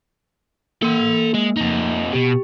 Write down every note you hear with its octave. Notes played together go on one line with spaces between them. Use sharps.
A#3 A4 C6
G#3
F2 D#4
B2 G4